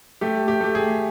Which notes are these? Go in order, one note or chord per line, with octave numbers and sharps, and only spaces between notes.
A3 G4
G4
A3 G4
G#4